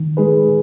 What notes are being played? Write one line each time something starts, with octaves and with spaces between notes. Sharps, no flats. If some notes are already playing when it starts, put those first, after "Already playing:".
Already playing: D#3
G#3 D#4 G#4 B4